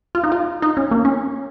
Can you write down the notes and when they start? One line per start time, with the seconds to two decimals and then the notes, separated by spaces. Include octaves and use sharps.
0.15 F4
0.24 D#4
0.32 F4
0.62 D#4
0.77 C#4
0.91 A#3
1.05 C#4